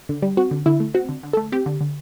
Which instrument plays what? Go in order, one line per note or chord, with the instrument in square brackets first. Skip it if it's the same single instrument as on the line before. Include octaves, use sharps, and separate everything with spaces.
[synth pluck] D3
G3
C4 F#4
D3
D3 E4
A3
C4 F#4
D3
D3
A3 A4
C4 G4
D3
D3